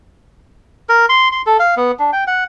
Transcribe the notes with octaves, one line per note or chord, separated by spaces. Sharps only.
A#4
C6
C6
A4
F5
B3
D4
G5
F#5